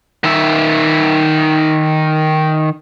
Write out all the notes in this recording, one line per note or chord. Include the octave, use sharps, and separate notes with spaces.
D#3 E5